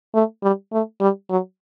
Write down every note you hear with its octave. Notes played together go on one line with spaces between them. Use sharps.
A3
G3
A3
G3
F#3